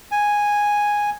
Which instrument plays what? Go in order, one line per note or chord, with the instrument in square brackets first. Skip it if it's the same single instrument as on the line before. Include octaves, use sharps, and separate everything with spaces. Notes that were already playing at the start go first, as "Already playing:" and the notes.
[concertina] G#5